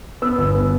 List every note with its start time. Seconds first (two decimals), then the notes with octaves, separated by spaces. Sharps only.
0.22 B3 E6
0.38 G1
0.55 B3